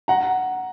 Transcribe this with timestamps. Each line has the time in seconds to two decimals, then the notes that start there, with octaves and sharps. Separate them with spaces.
0.08 F#5 A#5